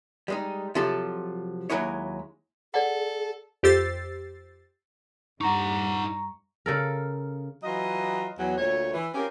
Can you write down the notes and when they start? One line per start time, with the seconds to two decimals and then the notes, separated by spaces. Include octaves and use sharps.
0.28 G3 G#3 D#4
0.75 C3 F3 F#3 F4 A4
1.70 D#2 G#2 F#3 G#3 E4 C#5
2.74 G#4 A4 D5 F#5
3.63 F2 G4 C5 E6 A6 C7
5.41 G2 D#4 F#5 A#5 C#6
6.66 C#3 A4 A#4
7.63 E3 F#3 F4 D#5
8.39 E2 F#3
8.57 D2 A#2 A3 C#5
8.94 E3
9.14 C4 C#4 F4 G4 G#4 A#4